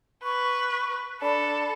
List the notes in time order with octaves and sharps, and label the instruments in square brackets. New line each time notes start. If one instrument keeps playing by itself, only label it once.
[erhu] B4 [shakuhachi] C#6
[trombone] D4 [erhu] A4 [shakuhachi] B5